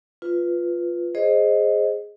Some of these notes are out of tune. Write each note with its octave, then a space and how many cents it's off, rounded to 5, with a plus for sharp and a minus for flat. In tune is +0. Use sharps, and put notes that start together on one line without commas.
F4 +0 B4 +0
G#4 +0 C5 +20 D#5 +0